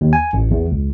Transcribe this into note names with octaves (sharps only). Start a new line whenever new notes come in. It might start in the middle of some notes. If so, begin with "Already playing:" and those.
D#2
G#5
A1
E2
C#2